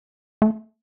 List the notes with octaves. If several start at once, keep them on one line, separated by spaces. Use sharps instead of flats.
A3